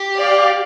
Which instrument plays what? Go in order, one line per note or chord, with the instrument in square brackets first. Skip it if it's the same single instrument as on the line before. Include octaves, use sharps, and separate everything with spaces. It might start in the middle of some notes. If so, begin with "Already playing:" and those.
Already playing: [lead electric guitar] G4
[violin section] D5 F5